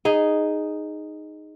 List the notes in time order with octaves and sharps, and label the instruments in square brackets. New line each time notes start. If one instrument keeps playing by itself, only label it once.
[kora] D#4 G#4